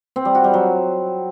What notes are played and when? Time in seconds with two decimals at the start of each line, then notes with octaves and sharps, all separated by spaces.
0.16 C4
0.25 G3
0.35 F#4
0.44 G3
0.54 F#3